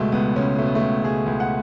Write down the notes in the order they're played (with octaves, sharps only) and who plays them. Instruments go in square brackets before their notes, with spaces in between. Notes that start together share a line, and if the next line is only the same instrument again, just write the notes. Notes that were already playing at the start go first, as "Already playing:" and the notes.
Already playing: [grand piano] C#2 B2 G#3 A3
C#2 B3
C#2 C#4
B2 A3
B3
A3
C#2
C#2 G#4
C#2
F#5